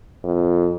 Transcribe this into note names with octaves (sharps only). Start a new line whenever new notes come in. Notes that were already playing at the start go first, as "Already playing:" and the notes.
F2